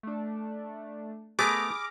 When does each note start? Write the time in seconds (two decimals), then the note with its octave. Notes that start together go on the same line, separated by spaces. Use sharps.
0.03 A3 D4
1.39 A3 B3 G#4 A#4 B5 D6 F6 A#6